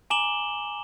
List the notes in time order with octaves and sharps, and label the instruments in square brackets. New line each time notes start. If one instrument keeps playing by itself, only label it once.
[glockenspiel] G#5 A#5 D6 E7 F#7 G7